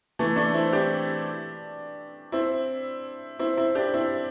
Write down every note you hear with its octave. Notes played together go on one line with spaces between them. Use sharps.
E3 A3
A3 D4
C4 E4
D4 G4
C4 E4
C4 E4
C4 E4
D4 G4
C4 E4